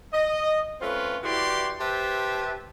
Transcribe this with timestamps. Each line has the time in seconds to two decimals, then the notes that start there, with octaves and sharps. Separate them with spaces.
0.13 D#5
0.81 A3 C4 C#4 F4 B4
1.23 E3 E4 F#4 G4 D5 C6
1.80 G4 B4 C5 E5 A5